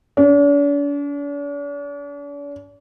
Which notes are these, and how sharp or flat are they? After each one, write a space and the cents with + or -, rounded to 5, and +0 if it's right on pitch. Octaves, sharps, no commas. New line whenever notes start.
D4 -45